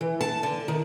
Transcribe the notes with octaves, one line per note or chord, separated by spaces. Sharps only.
E3
A5
D3
D#3